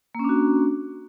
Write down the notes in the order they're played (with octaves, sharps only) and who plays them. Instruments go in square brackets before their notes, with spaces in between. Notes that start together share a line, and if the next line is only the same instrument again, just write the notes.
[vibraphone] A#3
C#4
D4
F#4